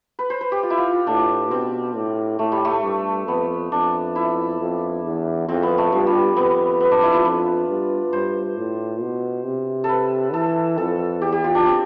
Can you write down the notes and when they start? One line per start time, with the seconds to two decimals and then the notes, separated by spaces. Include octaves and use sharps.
0.19 B4
0.30 C5
0.41 B4
0.52 G4
0.63 F4
0.70 E4
0.78 F4
1.07 A2 D4
1.51 B2 C4
1.95 A2
2.39 A2 A3
2.52 G3
2.65 A3
2.83 G2
3.27 F2 B3
3.72 F2 D4
4.16 E4
4.60 F2
5.04 E2
5.48 F2 C4
5.63 B3
5.78 A3
5.92 G2 F3
6.07 G3
6.36 F2 B3
6.80 B3
6.91 D4
7.03 E4
7.14 F4
7.25 F2 B4
7.68 G2
8.13 G2 C5
8.57 A2
9.01 B2
9.45 C3
9.84 A4
9.89 B4
10.33 E3 A4
10.78 F2 A4
11.22 E2 G4
11.32 G4
11.44 F4
11.55 D4
11.66 C4